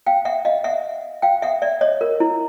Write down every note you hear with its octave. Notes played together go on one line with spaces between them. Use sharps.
F5 G5
E5 F#5
D#5 F5
E5 F#5
F5 G5
E5 F#5
D5 E5
C#5 D#5
A#4
E4